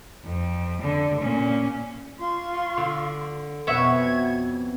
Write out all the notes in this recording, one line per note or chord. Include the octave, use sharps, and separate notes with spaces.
F2
D3
A#2 C#4
F4 C6 C#6
D3
F2 B2 B3 C#5 E5 F#5 G#6